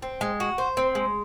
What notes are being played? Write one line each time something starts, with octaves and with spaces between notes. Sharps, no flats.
C4
G#3
F#4
C5
C4
G#3